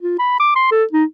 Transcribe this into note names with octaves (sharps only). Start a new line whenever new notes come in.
F4
B5
D6
C6
A4
D#4